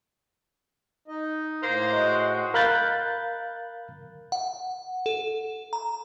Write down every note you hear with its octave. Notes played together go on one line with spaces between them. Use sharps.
D#4 D#5
A2 A#3 C5
G#3 F#4 D#5
A#4 F5 B5 F#6 G6 A6
F#5
A4
A#5